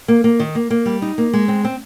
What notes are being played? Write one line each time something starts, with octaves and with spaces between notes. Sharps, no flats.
A#3
A#3
D#3
A#3
A#3
G3
D#4
A#3
G#3
C4
C4